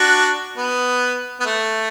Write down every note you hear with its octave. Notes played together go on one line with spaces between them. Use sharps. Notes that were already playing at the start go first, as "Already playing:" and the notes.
Already playing: D4 F#4
B3
B3
A3